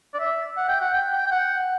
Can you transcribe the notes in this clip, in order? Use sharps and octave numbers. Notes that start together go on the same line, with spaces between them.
D5
E5
F#5
G5
F#5
G5
G5
G5
F#5